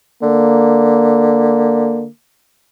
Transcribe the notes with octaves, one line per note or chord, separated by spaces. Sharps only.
D3 A#3